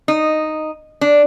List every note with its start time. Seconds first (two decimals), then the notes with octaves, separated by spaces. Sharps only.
0.08 D#4
1.01 D4